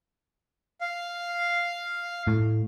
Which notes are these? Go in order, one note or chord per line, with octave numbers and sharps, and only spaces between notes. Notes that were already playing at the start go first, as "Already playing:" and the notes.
F5
A2